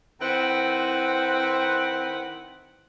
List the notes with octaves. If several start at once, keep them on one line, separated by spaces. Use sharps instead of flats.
D#3 C4 E4 B4 F#5